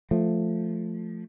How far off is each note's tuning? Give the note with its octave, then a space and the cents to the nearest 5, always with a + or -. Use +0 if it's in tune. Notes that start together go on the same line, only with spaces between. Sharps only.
F3 +0 A3 +0